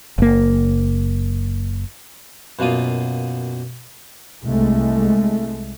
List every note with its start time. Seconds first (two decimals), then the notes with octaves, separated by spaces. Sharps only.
0.18 F#1 A#3
2.59 F#2 B2 A#3 F4 D#6
4.43 C2 G#3 A3